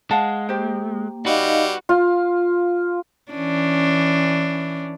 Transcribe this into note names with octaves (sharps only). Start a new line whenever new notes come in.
G#3 F5 F#5 A5
A#3 G4 C5
G3 D#4 F#4 B4 D#5 F5
F4
E3 C#4 D4